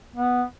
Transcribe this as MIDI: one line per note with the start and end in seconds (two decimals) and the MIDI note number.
0.16 0.43 59